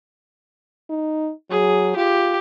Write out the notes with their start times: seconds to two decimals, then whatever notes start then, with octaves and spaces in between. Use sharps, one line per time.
0.90 D#4
1.50 F#3 G#4
1.96 F4 G4